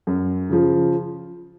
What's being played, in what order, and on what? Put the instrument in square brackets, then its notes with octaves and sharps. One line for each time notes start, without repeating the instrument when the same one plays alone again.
[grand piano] F#2
C#3 F3